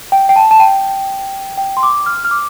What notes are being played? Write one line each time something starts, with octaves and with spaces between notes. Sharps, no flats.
G5
G5
A5
A5
G5
G5
C6
D6
F6
F6
D6